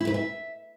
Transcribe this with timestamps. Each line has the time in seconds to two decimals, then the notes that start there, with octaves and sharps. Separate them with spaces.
0.01 E4
0.07 B4
0.14 E5